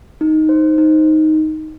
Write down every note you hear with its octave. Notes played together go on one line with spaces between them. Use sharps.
D#4
C5
D#4